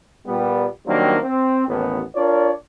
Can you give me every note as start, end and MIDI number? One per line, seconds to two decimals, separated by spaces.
0.27 0.66 46
0.27 0.66 55
0.27 0.66 59
0.87 1.17 51
0.87 1.17 54
0.87 1.17 55
0.87 1.17 58
0.87 1.17 60
0.87 1.17 62
1.22 1.67 60
1.68 2.01 33
1.68 2.01 39
1.68 2.01 59
2.16 2.51 62
2.16 2.51 65
2.16 2.51 70
2.16 2.51 73
2.16 2.51 74